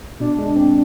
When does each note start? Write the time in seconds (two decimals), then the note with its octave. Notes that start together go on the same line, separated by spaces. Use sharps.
0.20 B2 D4
0.39 G#3
0.56 C4